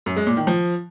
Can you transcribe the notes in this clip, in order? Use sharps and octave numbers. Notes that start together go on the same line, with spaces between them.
F#2
G#3
A#2
D#3
F3